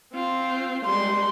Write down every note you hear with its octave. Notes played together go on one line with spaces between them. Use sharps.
C4 F4
G3 G#3 C6